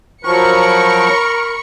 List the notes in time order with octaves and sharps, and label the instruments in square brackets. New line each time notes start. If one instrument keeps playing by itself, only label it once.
[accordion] F3 F#3 [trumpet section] A#4 [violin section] B5 C#6 C#7